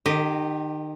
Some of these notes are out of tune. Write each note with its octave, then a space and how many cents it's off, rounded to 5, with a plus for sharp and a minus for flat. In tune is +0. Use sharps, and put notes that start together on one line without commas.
D#3 -30 G4 +0 D#5 +0